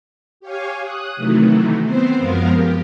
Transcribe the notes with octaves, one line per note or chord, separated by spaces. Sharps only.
G4 C#5 F5 G#5
D#6 F#6
C3 D#3 E3 F#3 A3
B3 C4 C5
F#2 F3 G#3 B3 A#4 F5
G4